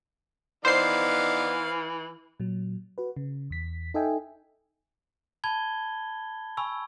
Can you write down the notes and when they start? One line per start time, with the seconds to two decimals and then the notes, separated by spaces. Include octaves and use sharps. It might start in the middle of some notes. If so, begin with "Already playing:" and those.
0.65 E3 B3 D#4 C5 D5 F5 C7
2.40 A#2 F#3
2.98 F#4 B4
3.16 C#3
3.50 E2 B6
3.94 D#4 A4 D#5 E5 G5 G#5
5.44 A5 B5 G#6 G7
6.57 G#5 B5 C#6 E6